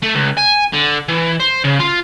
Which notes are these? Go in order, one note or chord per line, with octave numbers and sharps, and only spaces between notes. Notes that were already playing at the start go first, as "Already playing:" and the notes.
A3
C#2
G#5
D3
E3
C5
C#3
F4